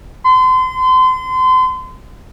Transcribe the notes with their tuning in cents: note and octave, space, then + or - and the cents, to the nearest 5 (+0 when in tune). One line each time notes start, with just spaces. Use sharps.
C6 -35